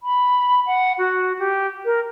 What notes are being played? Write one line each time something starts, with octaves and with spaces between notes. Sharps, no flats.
B5
F#5
F#4
G4
A#4